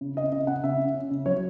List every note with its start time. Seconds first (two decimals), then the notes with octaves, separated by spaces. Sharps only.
0.01 C#3
0.16 C#3 D#5
0.32 C#3 D#5
0.47 C#3 F#5
0.64 C#3 E5
0.79 C#3
0.94 C#4
1.11 C#3
1.26 F#3 C#5